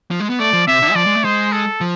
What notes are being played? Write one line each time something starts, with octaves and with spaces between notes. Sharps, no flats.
F3
G#3
B3
A3 D5
F3
C3 E5
D3
G#3
F3 D5
G#3
A3
G#3 C5
A4
F3